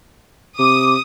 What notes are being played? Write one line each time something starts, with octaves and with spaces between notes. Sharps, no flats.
C3 D6 D#6